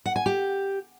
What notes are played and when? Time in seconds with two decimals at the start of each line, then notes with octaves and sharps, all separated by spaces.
0.06 F#5
0.16 G#5
0.26 G4